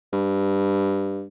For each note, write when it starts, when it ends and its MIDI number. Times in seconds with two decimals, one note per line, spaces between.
0.13 1.25 43